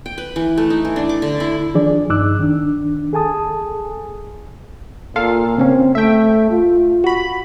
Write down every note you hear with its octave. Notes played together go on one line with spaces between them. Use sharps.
G5
B4
E3
A3
D#4
E3
D4
D6
D3
E4
D#3 F3 D4 G#4 D5
G2 D#4 D6 E6 F#6
D#3 D4
G#4 A4 G#5 A5 D#6
A#2 F4 A4 F5
C#3 A#3 C4 C#4
A3 E5 G5
F4
F#4 B5